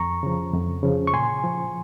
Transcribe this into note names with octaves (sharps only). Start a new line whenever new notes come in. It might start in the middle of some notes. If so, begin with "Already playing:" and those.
Already playing: F2 A#5 C#6
C#3 F3
F2
C#3 F3
C#6
A#2 G#5 C6
F3